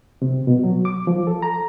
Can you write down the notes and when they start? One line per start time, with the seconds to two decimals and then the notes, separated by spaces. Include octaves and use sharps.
0.22 C3
0.47 B2
0.64 F#3
0.85 D6
1.07 F3
1.27 A4
1.42 A#5